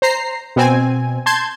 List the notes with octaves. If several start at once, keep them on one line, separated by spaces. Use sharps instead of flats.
C5 A#5 C7
B2 C4 G#5
A5 C6 G6 G#6